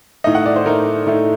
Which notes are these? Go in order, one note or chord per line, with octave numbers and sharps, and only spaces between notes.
A2 A3 D#4 D#5
F#5
D5
C5
A2 A3 D#4 A#4
A2 A3 D#4